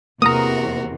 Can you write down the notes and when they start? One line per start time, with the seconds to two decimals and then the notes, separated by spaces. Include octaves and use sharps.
0.22 E2 C3 A#3 F#4 A#4 A#5 D#6